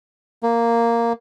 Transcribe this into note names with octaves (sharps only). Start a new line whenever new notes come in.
A#3